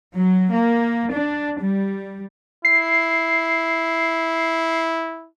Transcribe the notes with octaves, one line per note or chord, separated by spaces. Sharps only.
F#3
A#3
D4
G3
E4 C7